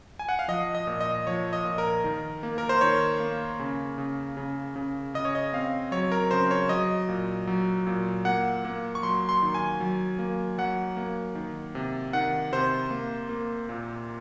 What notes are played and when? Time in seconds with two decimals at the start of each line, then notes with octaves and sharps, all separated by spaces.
0.19 G#5
0.29 F#5
0.39 F5
0.48 F3 D#5
0.75 D#5
0.87 A#2
1.01 D#5
1.27 F3 C#5
1.53 D#5
1.65 A#2
1.78 A#4
2.04 D#3
2.43 A#3
2.58 A#4
2.69 C5
2.81 D#3 C#5
3.20 A#3
3.59 C#3
3.98 C#3
4.37 C#3
4.76 C#3
5.14 C#3 D#5
5.25 C#5
5.35 D#5
5.53 C4 F5
5.92 F#3 C#5
6.12 A#4
6.31 C#3 C5
6.51 C#5
6.69 F#3 D#5
7.09 A#2
7.47 F#3
7.87 A#2
8.25 A#3 F#5
8.65 A#3
8.95 C#6
9.03 F#3 C6
9.29 C6
9.42 D#3
9.54 G#5
9.80 F#3
10.19 A#3
10.58 F#3 F#5
10.97 A#3
11.35 D#3
11.75 C3
12.13 D#3 F#5
12.52 C3 C5
12.91 A#3
13.29 A#3
13.69 A#2